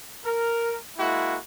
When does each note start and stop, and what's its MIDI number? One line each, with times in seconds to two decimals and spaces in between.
0.25 0.75 70
0.98 1.37 56
0.98 1.37 58
0.98 1.37 64
0.98 1.37 66